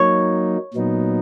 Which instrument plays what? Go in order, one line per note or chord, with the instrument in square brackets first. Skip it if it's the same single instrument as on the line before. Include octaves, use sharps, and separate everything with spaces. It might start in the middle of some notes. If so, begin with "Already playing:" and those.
Already playing: [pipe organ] F#3 A#3 D#4 [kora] C#5
[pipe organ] A#2 F#3 B3 D#4